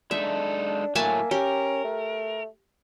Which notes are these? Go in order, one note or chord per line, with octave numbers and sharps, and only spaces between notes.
G#3 D4 D#4 A4 E5
A2 F#3 A3 A#3 E5 G#5 A5
C#4 G4 A#4
A3